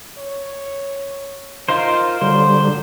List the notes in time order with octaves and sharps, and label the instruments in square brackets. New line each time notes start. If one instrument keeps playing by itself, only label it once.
[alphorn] C#5
[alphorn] D#4 [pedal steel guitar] F4 A#4 C5
[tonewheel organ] D3 G3 [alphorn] F#3 [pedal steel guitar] C5